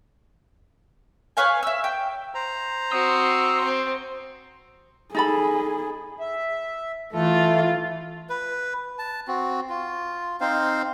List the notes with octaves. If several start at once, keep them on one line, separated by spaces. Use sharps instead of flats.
B4 C#5 F5 G#5
E5 E6
G5
C5 A#5
C4 F#4 C6 D#6 E6
C4
D#4 G#4 A4 B5
E5
E3 A3 F4 A4
B4
A5
C4 F#4
F4
C4 D#4 C5 F5